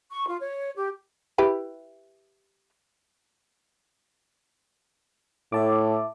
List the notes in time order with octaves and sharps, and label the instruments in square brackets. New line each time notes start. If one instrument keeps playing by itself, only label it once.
[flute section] C#6
F4
C#5
G4
[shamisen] E4 G4 B4
[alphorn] A2 [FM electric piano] E5 A5 D6